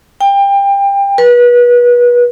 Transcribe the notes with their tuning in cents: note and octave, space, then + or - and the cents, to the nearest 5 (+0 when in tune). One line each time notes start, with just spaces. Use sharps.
G5 +25
B4 -30